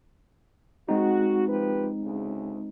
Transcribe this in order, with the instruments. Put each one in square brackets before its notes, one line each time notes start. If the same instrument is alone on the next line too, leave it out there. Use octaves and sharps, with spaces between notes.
[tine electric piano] G#3 C4 D#4 [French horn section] F#4
[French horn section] F3 G4 B4
D2 C#3